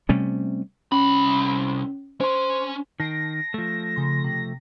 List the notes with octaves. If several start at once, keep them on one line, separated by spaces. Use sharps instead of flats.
C3 G3 A3 C#4
C2 C#4 B5
C#4 C5 C6
D#3 A5 A#6 C7 D7
F3 A3
C#3 C6
C3